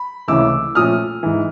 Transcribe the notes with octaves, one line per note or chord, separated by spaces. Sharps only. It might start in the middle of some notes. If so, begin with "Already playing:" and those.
Already playing: B5
C#2 C3 E3 A3 C#4 D6 E6
A#2 F3 A3 C#4 D#6 F6
G#2 E3